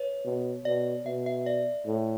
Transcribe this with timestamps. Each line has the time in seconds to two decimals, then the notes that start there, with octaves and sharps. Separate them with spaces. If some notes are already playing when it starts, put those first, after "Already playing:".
Already playing: B4 C#5
0.25 B2
0.65 B2 D5
1.06 B2 E5
1.26 E5
1.46 D5
1.87 A2